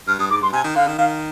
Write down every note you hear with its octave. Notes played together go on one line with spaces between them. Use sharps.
G2 F6
G2 D#6
G#2 D6
G2 C6
C3 G#5
D#3
D3 F5
D#3
D#3 F5